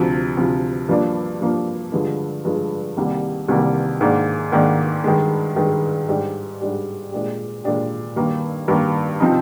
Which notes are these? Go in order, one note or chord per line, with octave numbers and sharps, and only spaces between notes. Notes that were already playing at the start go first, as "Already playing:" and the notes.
Already playing: D2 C3 F3
D2 C3 F3
G2 F3 A#3 D4
G2 F3 A#3 D4
G2 D3 F3 G#3
G2 D3 F3 G#3
C2 C3 D#3 G3 A#3
C2 C3 D#3 G3 A#3
G#2 D#3 A#3 D4
G#2 D#3 A#3 D4
G2 D#3 G#3
G2 D#3 G#3
G#2 G3 D4 G4
G#2 G3 D4 G4
A#2 G#3 D4 G4
A#2 G#3 D4 G4
G2 D#3 A#3
G2 D#3 A#3
C3 F3 C4 D#4